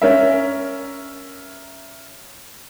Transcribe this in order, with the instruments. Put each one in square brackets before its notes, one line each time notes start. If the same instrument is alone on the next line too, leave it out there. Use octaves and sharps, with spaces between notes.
[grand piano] C#4 A#4 E5